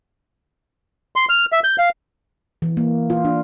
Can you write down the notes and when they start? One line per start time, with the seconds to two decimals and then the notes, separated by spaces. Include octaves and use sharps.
1.16 C6
1.29 F6
1.52 E5
1.64 G6
1.79 F5
2.62 E3
2.77 A#3
3.10 F4
3.25 D4